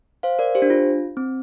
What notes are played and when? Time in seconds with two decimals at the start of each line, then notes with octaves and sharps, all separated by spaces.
0.23 C5 F5
0.39 A#4 D5
0.55 G4 C5
0.62 D4
0.70 F4
1.17 C4